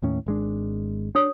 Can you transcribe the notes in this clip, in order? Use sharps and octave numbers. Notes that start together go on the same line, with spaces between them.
D#2 A2 C#4
G#1 G#3 D4
D4 F#4 C#5 D#6